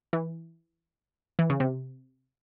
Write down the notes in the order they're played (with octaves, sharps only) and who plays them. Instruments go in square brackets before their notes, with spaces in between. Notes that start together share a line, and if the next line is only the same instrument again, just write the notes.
[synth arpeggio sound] E3
E3
C#3
C3